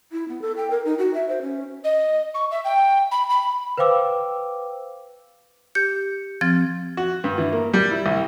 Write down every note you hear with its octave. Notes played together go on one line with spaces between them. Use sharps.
E4
B3
A4
G5
A#4
D#4
F#4
E5
C5
C#4
D#5
C#6
E5
G5
B5
B5
B4 C5 F5 G5 D6 E6
G4 G6 C#7
F3 C4 F6 A6
F#4
G2
E3
A#3
G3
E4
C2